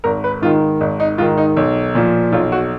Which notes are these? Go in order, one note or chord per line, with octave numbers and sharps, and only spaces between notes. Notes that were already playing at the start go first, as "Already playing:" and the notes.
G#1 A#4
B4
G#2 D#3 F4
G#1 D#4
D#4
G#2 D#3 F4
D#4
B1
A#2 F3
B1 F4
F#4